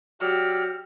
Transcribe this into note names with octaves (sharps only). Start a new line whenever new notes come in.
F#3 G4 D5 E6 F6